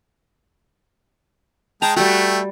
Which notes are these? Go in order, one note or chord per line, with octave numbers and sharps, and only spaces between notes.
G#3 G5 A5 A#5
G3 A3 F#4 G5